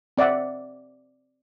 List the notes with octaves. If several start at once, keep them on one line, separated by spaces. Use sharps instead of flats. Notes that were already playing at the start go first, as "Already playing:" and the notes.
C4 D5 E5 F#5